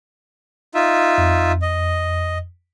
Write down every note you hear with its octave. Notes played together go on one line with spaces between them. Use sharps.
D#4 F4 E5
F2
D#5